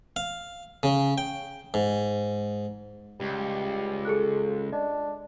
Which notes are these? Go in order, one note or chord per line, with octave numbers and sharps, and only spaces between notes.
F5
C#3
G5
G#2
C#2 G3
G#4 A4 F#6
D4 D#5